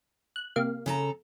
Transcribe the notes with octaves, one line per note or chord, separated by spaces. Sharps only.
F#6
C3 A#3 F5
C#3 A4 A#5